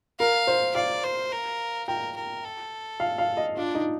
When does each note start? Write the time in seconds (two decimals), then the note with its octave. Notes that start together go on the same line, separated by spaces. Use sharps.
0.19 A#4 F5
0.47 C5
0.75 D5 F5
1.04 C5
1.32 A#4
1.88 A#4 G5
2.16 A#4
2.44 A4
3.00 F5
3.18 F5
3.37 D#5
3.57 D4 F4
3.75 D#4